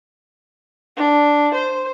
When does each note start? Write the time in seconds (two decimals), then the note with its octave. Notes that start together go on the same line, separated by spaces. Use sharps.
0.97 D4
1.54 C5